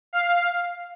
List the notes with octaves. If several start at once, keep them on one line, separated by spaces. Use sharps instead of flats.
F5